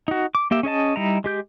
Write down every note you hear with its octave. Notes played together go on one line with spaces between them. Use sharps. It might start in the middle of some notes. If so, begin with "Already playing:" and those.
D#4 F#4
D6
A#3 G4 E5
C#4 G#4 D#5 A5
G3 D#4 E4 A#5
G#3 G4 G6